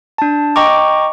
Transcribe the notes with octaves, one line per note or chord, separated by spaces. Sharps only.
D4 A5
D#5 G5 A#5 C#6 D6